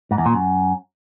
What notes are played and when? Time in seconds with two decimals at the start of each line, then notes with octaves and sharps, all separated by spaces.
0.11 G#2
0.18 E2
0.26 A#2
0.33 F#2